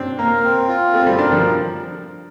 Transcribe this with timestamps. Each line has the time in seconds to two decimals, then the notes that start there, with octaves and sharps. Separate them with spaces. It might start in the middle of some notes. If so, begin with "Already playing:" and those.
Already playing: C4 D4
0.18 A#3 A#4
0.43 C4
0.68 F4
0.94 A3 C4
1.06 G3
1.19 D4 A#4
1.32 F3